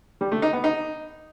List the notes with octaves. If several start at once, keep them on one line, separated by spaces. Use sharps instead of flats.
G3
A3
D#4
B3
D#4